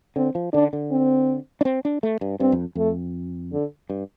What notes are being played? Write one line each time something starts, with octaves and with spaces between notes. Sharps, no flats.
D3 C4
F3
D3 D4
D3
C4
D4
C4
D4
A3
G2
G2 C4
F2
F2 A3
D3
G2